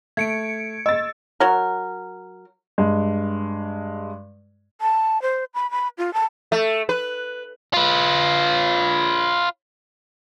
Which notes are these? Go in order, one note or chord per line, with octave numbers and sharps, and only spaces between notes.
A3 G#6 C#7 D7
D#5 E6 A6
F#3 A#4
G2 G#3
A5
C5
B5
B5
F4
A5
A3
B4
F4 B4